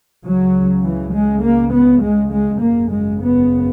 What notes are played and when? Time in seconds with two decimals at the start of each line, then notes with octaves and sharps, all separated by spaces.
0.24 C#2 C#3 F#3
0.83 E3
1.13 G#3
1.43 A#3
1.72 B3
2.02 G#3
2.31 G#3
2.61 G#1 F#2 C#3 A#3
2.91 G#3
3.21 B3